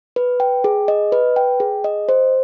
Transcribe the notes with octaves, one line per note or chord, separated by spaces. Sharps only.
B4
G5
G#4
D#5
B4
G5
G#4
D#5
C5